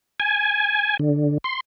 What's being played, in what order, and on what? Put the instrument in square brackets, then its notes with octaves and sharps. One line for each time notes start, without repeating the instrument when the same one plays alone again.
[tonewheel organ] G#5
D3
C6